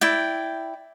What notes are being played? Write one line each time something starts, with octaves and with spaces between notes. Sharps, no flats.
E4 D5 G5